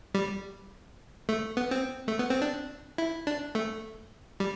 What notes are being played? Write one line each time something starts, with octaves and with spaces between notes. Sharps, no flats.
G3
A3
B3
C4
A3
B3
C4
D4
E4
D4
A3
G3